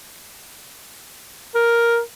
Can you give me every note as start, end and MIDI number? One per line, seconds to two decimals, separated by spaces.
1.55 2.00 70